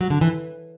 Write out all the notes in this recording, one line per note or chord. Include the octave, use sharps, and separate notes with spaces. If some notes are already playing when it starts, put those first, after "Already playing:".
F#3
D3
E3